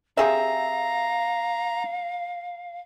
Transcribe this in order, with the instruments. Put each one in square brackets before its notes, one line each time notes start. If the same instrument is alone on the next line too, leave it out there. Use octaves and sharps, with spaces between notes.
[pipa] C3 G#4 E5 [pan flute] F5 [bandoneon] A#5